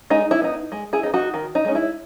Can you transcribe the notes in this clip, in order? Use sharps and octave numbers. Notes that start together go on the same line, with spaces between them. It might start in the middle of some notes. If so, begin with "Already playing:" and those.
G#3 D#4
E4
B3 D#4
G#3
E4 G#4
D#4
B3
D#4 F#4
D#3
D#4
G#3 C#4
E4